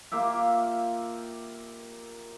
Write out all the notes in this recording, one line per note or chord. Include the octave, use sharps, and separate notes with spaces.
A#3 F4 G4 E5